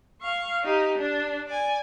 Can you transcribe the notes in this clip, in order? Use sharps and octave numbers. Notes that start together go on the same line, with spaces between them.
F5 C#6
D#4 G4
D4
D5 G#5